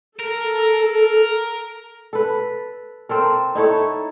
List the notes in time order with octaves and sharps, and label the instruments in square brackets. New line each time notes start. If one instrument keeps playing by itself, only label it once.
[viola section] A4 [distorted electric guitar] A#4
[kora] A4 B4
C4 A4 A#4
D#4 E4 A4 C#5